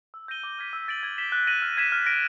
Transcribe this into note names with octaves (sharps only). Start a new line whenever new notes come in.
E6
G6 A#6 D#7 G7
D6
F6 G#6 B6
E6
A6 D7 F#7
G#6
B6 E7 G7
F#6
A#6 D#7 F#7
F6
G#6 B6 E7
F6
A#6 D7